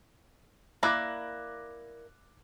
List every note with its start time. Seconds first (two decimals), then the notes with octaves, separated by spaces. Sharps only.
0.83 A#3 E4 D5 D6 F#6 A#6